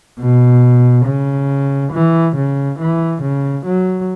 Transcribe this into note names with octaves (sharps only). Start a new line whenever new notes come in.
B2
C#3
E3
C#3
E3
C#3
F#3